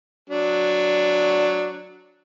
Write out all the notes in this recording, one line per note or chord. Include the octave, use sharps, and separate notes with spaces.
F#3 D4